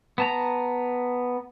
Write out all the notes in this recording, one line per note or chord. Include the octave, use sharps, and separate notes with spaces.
B3 A5 A#5